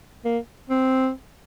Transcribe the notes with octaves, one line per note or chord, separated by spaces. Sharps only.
A#3
C4